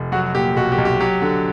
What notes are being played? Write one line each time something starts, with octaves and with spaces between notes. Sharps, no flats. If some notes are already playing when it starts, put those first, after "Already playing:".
Already playing: F1
F#3 F#4
A#2 G4
B1 F#4
G4
B1
G4
F#3 G4
D3